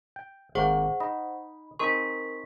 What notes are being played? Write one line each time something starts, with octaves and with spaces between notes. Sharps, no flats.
G5
G#1 A#3 G#4 C5 F#5 G5 C#6
D#4 D#5 B5
C4 D#4 G#4 A#4 C6 C#6 B6